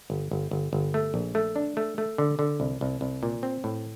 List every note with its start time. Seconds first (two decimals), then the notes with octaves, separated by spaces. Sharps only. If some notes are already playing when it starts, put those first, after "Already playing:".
0.10 G1
0.31 G1
0.51 G1
0.73 G1
0.94 A3
1.14 A#1
1.35 A3
1.56 D4
1.77 A3
1.98 A3
2.18 D3
2.39 D3
2.60 C2
2.81 C2
3.01 C2
3.23 A#2
3.43 C4
3.64 A2